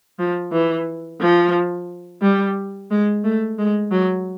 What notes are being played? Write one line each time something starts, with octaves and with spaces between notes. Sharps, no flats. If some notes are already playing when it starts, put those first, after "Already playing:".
F3
E3
F3
G3
G#3
A3
G#3
F#3